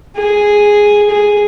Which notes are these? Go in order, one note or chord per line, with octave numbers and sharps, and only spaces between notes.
G#4
G#4